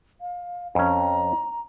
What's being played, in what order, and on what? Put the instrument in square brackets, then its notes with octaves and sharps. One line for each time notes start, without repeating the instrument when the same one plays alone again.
[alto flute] F5
[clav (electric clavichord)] F2 C#4 [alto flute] A#5